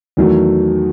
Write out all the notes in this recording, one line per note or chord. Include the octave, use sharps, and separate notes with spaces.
E2 D#3 F#3 A3